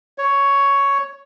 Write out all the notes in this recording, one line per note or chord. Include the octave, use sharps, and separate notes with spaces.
C#5